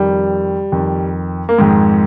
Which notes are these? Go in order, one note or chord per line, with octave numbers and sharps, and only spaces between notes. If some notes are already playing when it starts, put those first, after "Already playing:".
Already playing: F2 D#3 G3
F2 D#3
A#3
F2 G#2 D#3 G#3